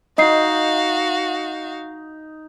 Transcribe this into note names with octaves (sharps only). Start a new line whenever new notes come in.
D#4 F#4 D#5 F5 C7